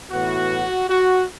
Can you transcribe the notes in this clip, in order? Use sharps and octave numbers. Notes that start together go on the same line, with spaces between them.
A2 E3 B3 F#4
F#4